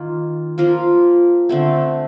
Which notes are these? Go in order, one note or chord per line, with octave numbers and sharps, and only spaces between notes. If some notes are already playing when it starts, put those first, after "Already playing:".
Already playing: D#3 A#3 F4
F3 A#3 F4 A#4
D3 A3 C4